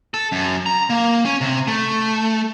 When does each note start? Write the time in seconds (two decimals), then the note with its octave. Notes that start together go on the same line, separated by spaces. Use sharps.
0.14 A4
0.32 F#2
0.66 A#5
0.90 A#3
1.25 C#4
1.41 C3
1.68 A3